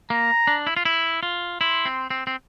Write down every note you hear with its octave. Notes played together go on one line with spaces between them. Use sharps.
A#3 A#5
D4
E4
F4
E4
F4
E4 C6
C4
C4
C4